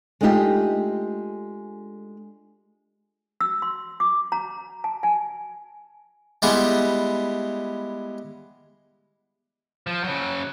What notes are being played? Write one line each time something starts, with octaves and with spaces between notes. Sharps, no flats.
G#3 A3 D4 D#4 F4 G4
E6
C6
D6
A#5
A5
G#5
G3 G#3 B3 E4 G4 G#4
F3
C#3 F#3